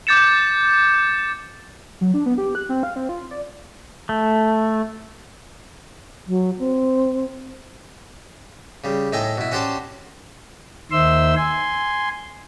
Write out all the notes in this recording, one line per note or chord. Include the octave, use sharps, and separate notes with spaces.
D6 G6 A6 C#7 E7
F#3
D4
B3
G4
F#6
C4
F5
C4
F4
D5
A3
F#3
C4
C#3 G3
A2 D#4 A4 G5 G#5
B2 E4
C#4 F#4 G4 C5 D5 A5
D#2 D#3 C5 E5 C6 E6
G#5 C6